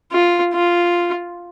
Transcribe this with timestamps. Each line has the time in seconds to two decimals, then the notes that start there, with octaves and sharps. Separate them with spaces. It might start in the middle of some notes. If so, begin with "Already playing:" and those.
0.12 F4
0.53 F4